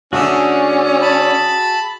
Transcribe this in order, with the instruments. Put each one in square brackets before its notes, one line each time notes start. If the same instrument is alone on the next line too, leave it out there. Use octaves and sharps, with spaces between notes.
[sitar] D3 A3 D4 [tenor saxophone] C#4 [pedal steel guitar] F#4 G#4 E5
[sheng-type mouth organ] A5 B5